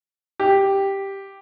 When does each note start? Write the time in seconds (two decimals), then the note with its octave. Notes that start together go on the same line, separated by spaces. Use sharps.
0.40 G4